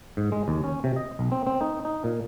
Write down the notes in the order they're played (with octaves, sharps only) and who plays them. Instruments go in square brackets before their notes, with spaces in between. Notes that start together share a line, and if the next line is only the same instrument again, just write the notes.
[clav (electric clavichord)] G#2
G#3
D#2
C#4
C3
D#5
B1
C4
C4
D#4
D#4
A#2